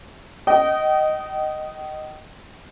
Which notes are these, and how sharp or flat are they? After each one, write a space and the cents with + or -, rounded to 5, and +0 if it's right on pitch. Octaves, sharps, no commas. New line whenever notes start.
D#5 -5 G5 -40